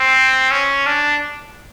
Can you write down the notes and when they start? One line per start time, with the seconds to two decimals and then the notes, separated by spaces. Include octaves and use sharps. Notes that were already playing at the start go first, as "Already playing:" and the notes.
Already playing: C4
0.51 C#4
0.86 D4